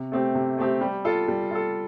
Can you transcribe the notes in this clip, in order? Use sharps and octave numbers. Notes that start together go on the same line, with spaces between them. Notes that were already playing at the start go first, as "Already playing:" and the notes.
Already playing: C3
A3 C4 G4
C3
A3 C4 G4
G3
F4 A4
G3
F4 A4